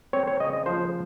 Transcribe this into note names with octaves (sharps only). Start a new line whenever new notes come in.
C4 C#5
C#5
C#3 D#5
D#5
F3 C5